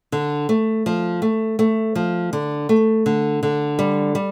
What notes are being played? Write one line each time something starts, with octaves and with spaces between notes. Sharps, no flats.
D3
A3
F3
A3
A3
F3
D3
A3
D3
D3
G3
G3